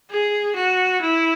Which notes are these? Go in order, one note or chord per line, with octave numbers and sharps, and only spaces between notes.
G#4
F#4
E4